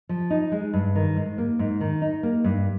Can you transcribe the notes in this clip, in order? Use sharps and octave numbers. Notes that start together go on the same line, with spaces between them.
F3
D#4
G#3
G2
D#3
G#2
A#3
G#2
D#3
D#4
A#3
G2